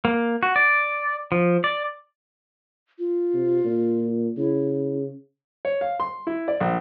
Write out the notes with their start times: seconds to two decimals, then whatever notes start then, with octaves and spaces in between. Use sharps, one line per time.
0.05 A#3
0.43 F#4
0.56 D5
1.32 F3
1.64 D5
2.99 F4
3.33 C3
3.64 A#2
4.38 C#3 E4
5.65 C#5
5.81 F5
6.00 C6
6.27 E4
6.48 D5
6.60 A#1